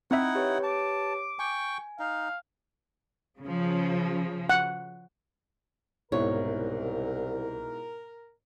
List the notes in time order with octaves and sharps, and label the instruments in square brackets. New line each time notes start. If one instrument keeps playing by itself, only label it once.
[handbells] C4 E5 [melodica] D#4 E4 F#5
[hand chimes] G4 B4 C#5
[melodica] A5 [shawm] D6
[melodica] G5 C#6 [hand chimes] G#5
[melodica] D#4 [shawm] F5
[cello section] C#3 F3
[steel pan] F#5
[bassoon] C2 [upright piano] G#2 B2 E4 [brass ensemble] A#4 [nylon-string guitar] C#5